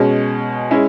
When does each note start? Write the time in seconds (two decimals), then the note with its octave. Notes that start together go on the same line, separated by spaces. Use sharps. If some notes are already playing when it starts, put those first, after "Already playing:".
Already playing: B2 G#3 C#4
0.71 G#3 C#4 E4